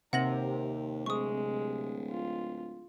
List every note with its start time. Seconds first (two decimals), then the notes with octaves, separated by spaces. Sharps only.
0.13 D#2 C3 A#4 F#5 A#6 F#7
1.06 D1 G#3 C#6 D#6
2.10 F4